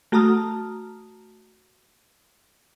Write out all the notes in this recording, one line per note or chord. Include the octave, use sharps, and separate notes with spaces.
A3 F#4 A5 A#5 D#6 F6